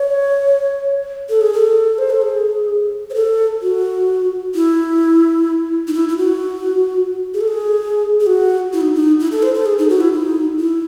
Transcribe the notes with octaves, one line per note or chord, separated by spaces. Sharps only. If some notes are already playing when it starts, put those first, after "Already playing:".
Already playing: C#5
A4
G#4
A4
C5
A4
G#4
C5
A4
F#4
E4
D#4
E4
E4
F#4
G#4
A4
G#4
G#4
F#4
E4
D#4
D#4
E4
A4
C5
A4
G#4
D#4
F#4
E4
D#4
E4